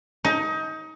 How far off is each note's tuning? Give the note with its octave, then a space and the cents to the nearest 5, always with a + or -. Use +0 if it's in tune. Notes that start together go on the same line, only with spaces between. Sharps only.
D#4 +25